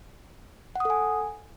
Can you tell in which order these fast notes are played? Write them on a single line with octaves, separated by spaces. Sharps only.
F#5 D#6 A4 G#5